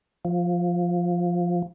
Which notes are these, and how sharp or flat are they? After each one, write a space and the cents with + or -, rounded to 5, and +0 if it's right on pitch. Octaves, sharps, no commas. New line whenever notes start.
F3 +5